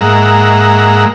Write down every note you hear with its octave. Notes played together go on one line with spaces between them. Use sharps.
G#2 G#3 A#3 E5 F#5 A#5